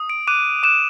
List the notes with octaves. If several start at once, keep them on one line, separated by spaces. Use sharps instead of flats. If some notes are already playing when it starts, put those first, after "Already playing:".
Already playing: D#6
D7
D6 F#6 D#7
D6 F#6 E7